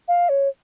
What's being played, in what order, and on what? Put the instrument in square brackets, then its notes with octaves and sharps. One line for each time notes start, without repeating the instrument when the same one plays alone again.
[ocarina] F5
C#5